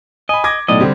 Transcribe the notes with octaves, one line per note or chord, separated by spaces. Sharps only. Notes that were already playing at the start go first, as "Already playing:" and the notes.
D#5 G#5 B5
D6 G#6 A#6
B1 A2 D5 D#5
D3 G3 C4